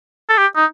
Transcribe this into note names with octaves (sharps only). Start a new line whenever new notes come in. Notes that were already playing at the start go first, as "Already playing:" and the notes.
A4
G4
D#4